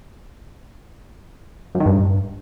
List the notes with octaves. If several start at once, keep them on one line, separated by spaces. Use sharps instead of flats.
F#2
D#3
G2